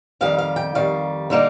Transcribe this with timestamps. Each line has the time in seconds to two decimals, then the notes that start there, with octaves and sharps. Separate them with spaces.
0.21 F2 D#3 G3 F5
0.38 F5
0.56 G5
0.75 F2 D#3 G3 F5
1.30 D3 G3 A#3 D#4